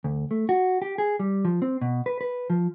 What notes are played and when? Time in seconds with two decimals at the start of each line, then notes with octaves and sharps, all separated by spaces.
0.04 D2
0.31 A3
0.49 F#4
0.82 G4
0.98 G#4
1.20 G3
1.45 F3
1.62 C4
1.81 B2
2.06 B4
2.21 B4
2.50 F3